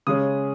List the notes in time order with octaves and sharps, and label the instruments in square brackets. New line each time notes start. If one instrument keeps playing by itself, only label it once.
[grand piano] C#3 G#3 C#4 D#6